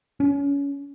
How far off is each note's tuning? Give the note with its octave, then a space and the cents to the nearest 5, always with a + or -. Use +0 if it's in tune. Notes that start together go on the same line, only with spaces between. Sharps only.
C#4 +25